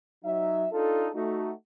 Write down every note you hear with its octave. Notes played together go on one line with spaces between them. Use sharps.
F#3 D#4 E5
D4 D#4 F4 A4
A3 D#4 F#4